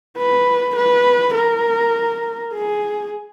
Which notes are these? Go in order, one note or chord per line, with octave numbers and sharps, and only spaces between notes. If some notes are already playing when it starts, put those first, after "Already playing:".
B4
B4
A#4
G#4